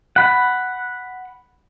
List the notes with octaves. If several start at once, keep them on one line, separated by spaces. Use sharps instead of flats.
F#5 B5